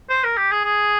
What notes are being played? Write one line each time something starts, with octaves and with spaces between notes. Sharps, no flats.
C5
A#4
G4
G#4
G#4